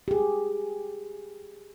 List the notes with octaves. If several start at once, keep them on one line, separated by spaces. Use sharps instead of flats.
G4 G#4